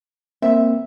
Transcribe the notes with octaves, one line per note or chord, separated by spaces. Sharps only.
A#3 C4 E5